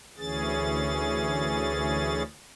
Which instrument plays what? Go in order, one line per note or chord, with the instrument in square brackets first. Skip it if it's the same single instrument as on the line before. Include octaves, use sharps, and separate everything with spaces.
[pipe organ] D2 E3 C#4 G#4 A6